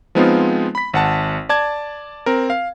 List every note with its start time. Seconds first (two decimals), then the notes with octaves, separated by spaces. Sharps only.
0.15 F3 G#3 B3 C4 D#4 F4
0.75 B5 B6
0.94 G#1 F#5 A5
1.49 D5 A5 G#6
2.26 C4 A#4
2.50 F5